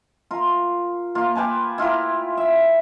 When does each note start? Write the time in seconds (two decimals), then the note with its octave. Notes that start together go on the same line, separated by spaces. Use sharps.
0.31 F4 A#4
1.15 A#3 F4
1.35 G4 B4 G#5 A5
1.78 E4 F4 G4 A#4
2.37 E5